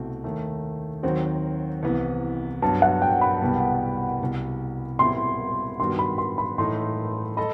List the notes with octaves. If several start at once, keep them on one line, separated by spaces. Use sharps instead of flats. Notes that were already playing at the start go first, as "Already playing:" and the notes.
Already playing: C2 B2 A3 C4 F#4
D#2 D#3 A3
D#2 D#3 F#3 C4 F#4 C5
C2 C3 E3 B3
G2 F#3 B3 A5
F#5
G5
B5
C2 B2 G3 B3
C2 B2 G3
B2 G3 C4 E4 C6
G2 D#3 G3 B3 F#4 C6
B5
C6
B5
A2 E3 A3 D#4 C6
A4 D#5 B5